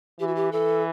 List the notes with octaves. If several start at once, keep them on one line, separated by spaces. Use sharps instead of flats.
E3 G4
F#4
G4
E3 A4